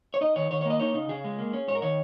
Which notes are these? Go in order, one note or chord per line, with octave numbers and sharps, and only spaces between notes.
C#5
D#4 D#5
D#3 C#5
D#3 C#5
C#5
A#3 D#5
D#4 C#5
C#3 D#4
C#3 G#4
G#3
A#3
C#4
G#2 C#5
A#4
D#3 C#5